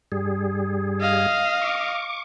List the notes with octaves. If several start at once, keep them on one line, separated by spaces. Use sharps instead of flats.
G2 G3 G#4
D#5 F5
C#6 D6